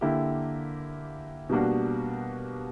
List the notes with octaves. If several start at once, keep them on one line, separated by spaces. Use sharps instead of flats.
D3 A#3 E4 G4
B2 G3 A#3 D4 F#4